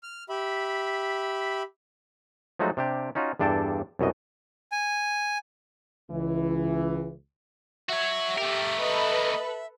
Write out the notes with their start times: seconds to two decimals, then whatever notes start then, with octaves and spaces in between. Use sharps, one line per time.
0.03 F6
0.29 G4 E5 B5
2.59 F3 F#3 G#3 A3 D#4 F#4
2.77 C3 D4 G4
3.15 C#4 D#4 F4 F#4
3.39 E2 G2 D4 A4 G5 A5
3.99 C2 F#2 B2 D#5
4.72 G#5
6.10 C#2 E3
7.89 F#4 C#5 E5
8.38 A3 G4 A#4
8.80 A4 B4 D#5